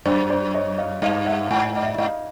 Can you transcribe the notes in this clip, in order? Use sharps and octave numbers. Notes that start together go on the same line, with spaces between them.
F#2 C5 D5
C5 D5
C#5 D#5
D#5 F5
G2 D#5 F5
E5 F#5
G#2 F#5 G#5
D#5
D5 E5
G#2 D#5 F5